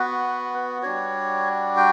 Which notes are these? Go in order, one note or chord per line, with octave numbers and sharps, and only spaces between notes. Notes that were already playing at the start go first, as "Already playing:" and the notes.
Already playing: B3 F#4 B4
G3 D4 F#4 C#5
G5